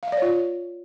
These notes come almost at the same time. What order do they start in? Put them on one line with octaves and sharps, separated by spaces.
F5 E5 D5 C#5 F4